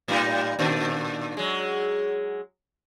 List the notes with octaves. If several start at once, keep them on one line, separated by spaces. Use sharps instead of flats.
A2 G3 D#4
A#2 D#3 D4
F#3 G#3